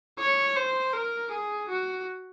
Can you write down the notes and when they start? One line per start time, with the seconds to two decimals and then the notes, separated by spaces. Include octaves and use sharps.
0.18 C#5
0.56 C5
0.93 A#4
1.31 G#4
1.69 F#4